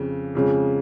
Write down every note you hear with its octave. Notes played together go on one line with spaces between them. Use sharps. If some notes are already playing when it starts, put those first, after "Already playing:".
Already playing: F2 C#3
F2 C#3 G#3